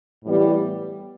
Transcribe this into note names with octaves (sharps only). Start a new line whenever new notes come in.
A2 E3 G3 B3